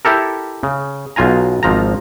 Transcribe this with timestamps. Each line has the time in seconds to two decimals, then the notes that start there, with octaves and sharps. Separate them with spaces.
0.05 E4 G4 A4 A#4
0.63 C#3
1.16 B1 B2 F4 G#5 A#5
1.63 G#1 F3 A#5